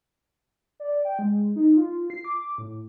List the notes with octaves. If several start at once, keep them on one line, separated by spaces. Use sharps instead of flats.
D5
G5
G#3
D#4
F4
C7
D6
A2